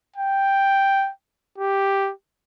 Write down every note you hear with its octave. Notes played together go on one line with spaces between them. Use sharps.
G5
G4